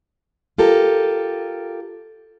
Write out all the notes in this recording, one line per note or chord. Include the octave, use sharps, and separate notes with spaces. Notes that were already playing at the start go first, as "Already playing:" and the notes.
F4 G4 A4 A#4